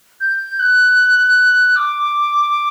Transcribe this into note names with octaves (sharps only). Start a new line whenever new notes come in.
G6
F#6
D6